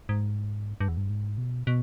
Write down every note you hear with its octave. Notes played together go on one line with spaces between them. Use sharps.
G#2
G2
E2
G2
G#2
B2
B2